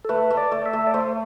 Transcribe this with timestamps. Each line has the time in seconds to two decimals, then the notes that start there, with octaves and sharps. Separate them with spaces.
0.05 A4
0.09 A3 B4
0.30 A3
0.37 D5
0.52 A3
0.66 E5
0.73 A3
0.87 D5
0.94 A3 C5